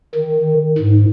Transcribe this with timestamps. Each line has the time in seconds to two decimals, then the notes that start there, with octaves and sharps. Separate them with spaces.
0.15 D#3
0.78 G#2